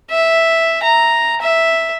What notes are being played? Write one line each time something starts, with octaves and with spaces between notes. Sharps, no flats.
E5
A#5
E5